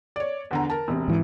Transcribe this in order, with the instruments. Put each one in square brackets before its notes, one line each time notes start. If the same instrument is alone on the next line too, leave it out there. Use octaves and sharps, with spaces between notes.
[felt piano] C#5 D5
E2 D3 A#5
A#4 A5
E1 C3
[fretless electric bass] G#2 E3